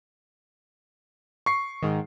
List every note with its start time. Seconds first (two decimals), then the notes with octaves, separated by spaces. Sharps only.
1.46 C#6 C7
1.83 G#2 D#3